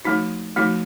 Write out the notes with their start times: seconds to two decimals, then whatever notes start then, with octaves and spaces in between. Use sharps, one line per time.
0.05 F3 A3 D#4 F#4
0.56 F3 A3 D#4 F#4